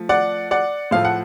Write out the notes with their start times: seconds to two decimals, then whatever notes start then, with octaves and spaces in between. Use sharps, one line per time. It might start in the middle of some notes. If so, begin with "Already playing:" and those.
Already playing: F3 A3
0.09 D5 F#5
0.51 D5 F#5
0.91 A2 F3 A3 F5
1.05 F#5